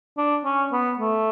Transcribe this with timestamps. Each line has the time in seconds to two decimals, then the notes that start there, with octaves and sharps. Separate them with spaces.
0.17 D4
0.45 C#4
0.72 B3
0.99 A3